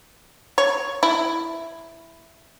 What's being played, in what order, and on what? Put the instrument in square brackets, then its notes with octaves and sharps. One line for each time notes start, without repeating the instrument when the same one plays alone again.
[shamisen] C#5
E4